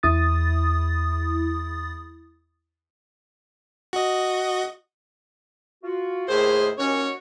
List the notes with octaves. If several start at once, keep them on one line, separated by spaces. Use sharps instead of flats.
E2 E4 D#6 A6
F#4 D#5
F4 F#4
D#2 A2 G#4 C5
D#2 C#4 F#4 C#5